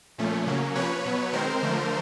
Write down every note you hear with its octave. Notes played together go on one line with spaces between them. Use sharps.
A#2 F3 A3 C#4
C#3 F#3 A#3 C#4
C3 F3 A#3 C#4 B4 C#5
B2 F#3 B3
D#3 G#3 C4 A#4 C5
D3 F3 A3